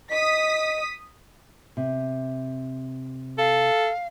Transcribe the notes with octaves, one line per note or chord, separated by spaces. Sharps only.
D#5 D#6 B6
C3
A4 F5